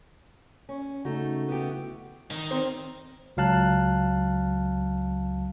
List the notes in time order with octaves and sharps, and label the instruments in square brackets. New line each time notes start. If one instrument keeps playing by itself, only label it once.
[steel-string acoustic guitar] C#4
[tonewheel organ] C#3 F#4 [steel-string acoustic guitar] A3 D#4
[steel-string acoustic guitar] B3 E4 G4
[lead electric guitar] D#3 D#4
[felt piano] C4
[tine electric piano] C#2 F#3 F5 A5 F#6